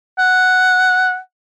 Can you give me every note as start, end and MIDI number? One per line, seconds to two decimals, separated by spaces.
0.19 1.18 78